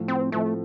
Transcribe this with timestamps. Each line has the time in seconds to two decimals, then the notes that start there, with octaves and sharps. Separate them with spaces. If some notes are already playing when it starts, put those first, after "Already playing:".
Already playing: A2 F3 A3
0.08 C4
0.32 A2 F3 A3 C4 A4